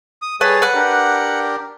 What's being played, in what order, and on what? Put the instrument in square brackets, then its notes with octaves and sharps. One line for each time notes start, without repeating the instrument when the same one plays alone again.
[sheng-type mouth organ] D#6
[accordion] G3 [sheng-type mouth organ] G#4 C#5 A5 [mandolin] B4
[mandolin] B4 F#6 [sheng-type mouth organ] F#5
[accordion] D4 G4 A#4